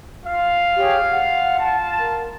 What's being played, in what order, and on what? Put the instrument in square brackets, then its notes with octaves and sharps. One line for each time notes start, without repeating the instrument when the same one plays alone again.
[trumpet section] F4 F5
[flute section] G4 G#4 C#5
F#5
[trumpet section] F4 A5
[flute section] A#4